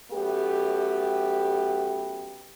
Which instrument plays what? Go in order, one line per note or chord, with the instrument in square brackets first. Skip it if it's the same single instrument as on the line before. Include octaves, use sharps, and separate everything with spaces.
[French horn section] F#2 A3 B3 G4